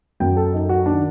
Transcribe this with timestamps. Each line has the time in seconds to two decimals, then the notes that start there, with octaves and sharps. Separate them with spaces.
0.20 F#2 F#3 G5
0.36 A4
0.53 D#4
0.69 F#4
0.86 D#3 D4